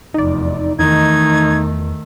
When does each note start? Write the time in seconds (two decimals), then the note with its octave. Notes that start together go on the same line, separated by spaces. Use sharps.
0.14 F1 E2 D#4 D5
0.79 E2 D#3 A3 D#4 G#6